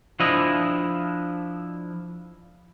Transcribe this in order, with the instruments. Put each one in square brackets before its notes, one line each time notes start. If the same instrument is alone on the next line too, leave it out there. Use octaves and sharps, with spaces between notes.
[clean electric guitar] F3 D4 E4 D#5